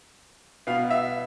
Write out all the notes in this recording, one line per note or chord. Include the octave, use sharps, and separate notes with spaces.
B2 B3 F5
E5